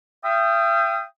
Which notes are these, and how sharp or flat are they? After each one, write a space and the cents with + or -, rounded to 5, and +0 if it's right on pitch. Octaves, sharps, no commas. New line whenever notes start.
E5 +45 G5 +0 D#6 +0